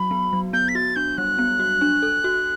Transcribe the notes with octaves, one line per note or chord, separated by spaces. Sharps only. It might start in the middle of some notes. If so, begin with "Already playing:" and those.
Already playing: F#3 F#4 B5
B3
F#3
B3 G6
B6
F#4 A6
D4 G6
G3 F#6
B3
F#4
D4
A4
F#4